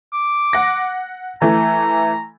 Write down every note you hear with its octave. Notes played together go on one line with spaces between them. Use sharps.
D6
F#5 A#6
E3 A3 A#5